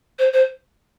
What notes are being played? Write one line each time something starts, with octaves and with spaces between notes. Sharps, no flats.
C5
C5